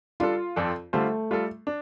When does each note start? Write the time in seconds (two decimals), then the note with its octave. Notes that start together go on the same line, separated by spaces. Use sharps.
0.20 G3 D4 F4 A4
0.56 F2 F3 C4 A4 D5
0.93 D3 G3 A3 F4 C5
1.31 G3 F4 A4
1.67 D4